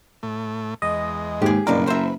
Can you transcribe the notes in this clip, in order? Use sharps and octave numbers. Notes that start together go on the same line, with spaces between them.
A2 A3
E2 G#3 D#5
D#2 G#2 G4 G#4
F#1 B1 G2 D4 A#4 B4
C5 E5